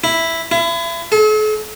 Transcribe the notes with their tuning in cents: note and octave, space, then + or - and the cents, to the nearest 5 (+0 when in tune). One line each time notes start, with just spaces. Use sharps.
E4 +0
E4 +35
A4 -45